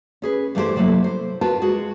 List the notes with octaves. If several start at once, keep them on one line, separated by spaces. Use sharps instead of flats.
C#4 G#4 B4
G2 E3 A3 D#4 G4 C5
C3 F#3 A3 A#3 E4
C5
F4 F#4 A#4 B4 G5 A5
G#3 F#4 G#4